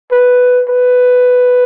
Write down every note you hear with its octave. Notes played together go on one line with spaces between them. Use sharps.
B4
B4